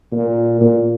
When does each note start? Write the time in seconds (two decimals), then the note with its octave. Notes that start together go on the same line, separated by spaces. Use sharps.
0.12 A#2
0.61 A#2